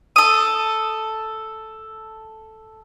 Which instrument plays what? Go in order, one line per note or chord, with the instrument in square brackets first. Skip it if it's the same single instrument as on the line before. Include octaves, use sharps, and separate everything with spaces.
[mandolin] A4 D#6